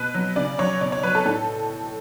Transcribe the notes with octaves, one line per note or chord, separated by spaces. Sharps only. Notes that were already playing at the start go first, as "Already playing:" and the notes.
Already playing: B2 B4
F#3
C#3 D5
F#3 C#5
B2 D5
C#5
F#3 B4
A4
A2 A4